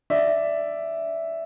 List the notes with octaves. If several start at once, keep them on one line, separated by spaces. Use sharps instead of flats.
D5 E5